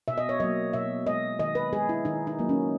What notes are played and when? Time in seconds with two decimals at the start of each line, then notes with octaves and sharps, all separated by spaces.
0.08 B2 E5
0.18 D#5
0.29 C#5
0.40 F#3 A#3 D#5
0.73 B2 E5
1.07 G#3 D#5
1.39 D#3 D#5
1.55 B4
1.73 G#3 G#4
1.89 E4
2.05 D#3 D#4
2.27 D#4
2.39 F#3 A#3
2.49 C#4